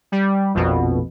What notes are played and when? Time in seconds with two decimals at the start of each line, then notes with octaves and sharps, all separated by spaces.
0.12 G3
0.55 A#1 F2 B2